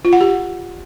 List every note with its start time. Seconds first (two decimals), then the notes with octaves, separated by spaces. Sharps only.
0.05 F4
0.13 F#5
0.21 G4